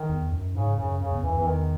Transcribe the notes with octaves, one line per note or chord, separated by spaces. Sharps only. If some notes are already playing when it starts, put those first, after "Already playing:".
Already playing: D#3
E2
F#2
G#2 C#3
F#2 C#3
F#2 C#3
E2
F#2 E3
E2 E3
D#3